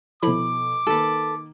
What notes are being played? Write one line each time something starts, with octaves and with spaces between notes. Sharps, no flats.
B2 F3 E4 A4 B5 D6
D#3 A#3 A4 B4